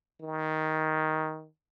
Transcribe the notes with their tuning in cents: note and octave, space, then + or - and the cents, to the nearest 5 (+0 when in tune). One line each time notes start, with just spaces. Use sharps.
D#3 +10